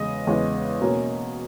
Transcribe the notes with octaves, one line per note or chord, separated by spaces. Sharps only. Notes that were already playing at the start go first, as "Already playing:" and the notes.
Already playing: E2 C#3 G#3 D#5
E2 C#3 G#3
B2 A#3 C#4